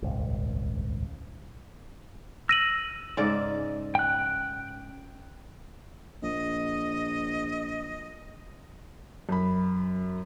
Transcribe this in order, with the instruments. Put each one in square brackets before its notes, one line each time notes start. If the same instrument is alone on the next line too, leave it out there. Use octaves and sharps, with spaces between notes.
[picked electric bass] D#1 G#1 C#2
[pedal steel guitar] E6 [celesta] A#6 D#7 F#7
[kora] G#2 C#3 D5
[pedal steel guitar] G5 F#6
[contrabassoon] A#1 [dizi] D#5
[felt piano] F#2 B5